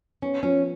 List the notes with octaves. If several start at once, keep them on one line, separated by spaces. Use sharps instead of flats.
B3 C#4
F3 C#4